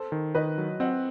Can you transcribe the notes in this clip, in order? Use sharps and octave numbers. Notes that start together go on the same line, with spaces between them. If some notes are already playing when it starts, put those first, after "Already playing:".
Already playing: A4 C5
D#3
D#3 B4 D#5
F#3
C4 D#5 F#5